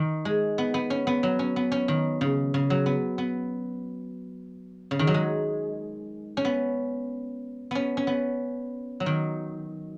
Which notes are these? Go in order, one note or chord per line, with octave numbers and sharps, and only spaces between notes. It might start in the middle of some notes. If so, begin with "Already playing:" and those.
Already playing: D#3
G#3
B3
B3
C#4
B3
F#3
C#4
B3
C#4
D#3
C#3
C#3
F#3
B3
B3
C#3
D#3
F#3
G#3
C#4
B3
B3 C#4
C#4
B3
F#3
D#3